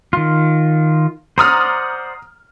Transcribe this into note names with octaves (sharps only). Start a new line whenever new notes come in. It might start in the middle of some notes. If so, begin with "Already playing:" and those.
D#3 F4
C5 D5 F#5 A#5 D#6 F6